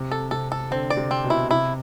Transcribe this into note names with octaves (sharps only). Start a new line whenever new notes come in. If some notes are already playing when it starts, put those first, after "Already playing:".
Already playing: C3
A4
C3 A4
A4
D3 C4
D5
C3
C4
B2
E4
C3 E4